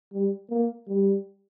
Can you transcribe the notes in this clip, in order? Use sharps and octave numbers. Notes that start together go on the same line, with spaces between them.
G3
A#3
G3